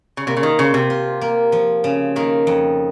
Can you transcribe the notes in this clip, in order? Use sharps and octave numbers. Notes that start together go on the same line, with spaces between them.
C#3
C3 A#3
C#3
D#3
C#3 C5
C3
F4
A#3
F3
C#3
D#3 A#3
F2